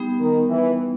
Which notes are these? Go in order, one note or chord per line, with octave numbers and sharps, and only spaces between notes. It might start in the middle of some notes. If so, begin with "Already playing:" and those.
Already playing: G3 B3 D#4 G4
D#3
E3